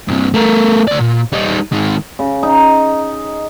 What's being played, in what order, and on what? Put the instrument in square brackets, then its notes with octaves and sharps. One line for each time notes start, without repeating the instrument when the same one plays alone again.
[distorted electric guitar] G2 C3
A3 A#4
D2 D5
A#2
G3 D#4
D#3 G#3
[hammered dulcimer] C#3
D#4